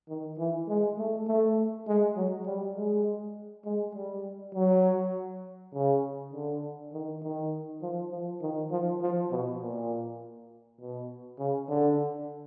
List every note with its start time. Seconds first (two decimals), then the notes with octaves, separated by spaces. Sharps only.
0.09 D#3
0.38 E3
0.69 G#3
0.98 A3
1.27 A3
1.88 G#3
2.17 F#3
2.47 G3
2.77 G#3
3.65 G#3
3.95 G3
4.55 F#3
5.74 C#3
6.34 D3
6.93 D#3
7.23 D#3
7.82 F3
8.11 F3
8.42 D#3
8.71 F3
9.02 F3
9.31 B2
9.61 A#2
10.80 B2
11.39 C#3
11.69 D3